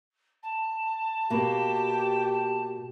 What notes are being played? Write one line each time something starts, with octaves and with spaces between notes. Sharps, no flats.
A5
B2 A#3 G4